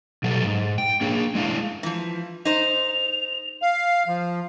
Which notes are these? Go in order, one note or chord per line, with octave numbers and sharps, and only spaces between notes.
B2 F#3 G3 A4
G#2
G5
A#3 D4 G#4
G#3 D4 E4 F5
E3 F3
D#4 C5 F7
F5
F3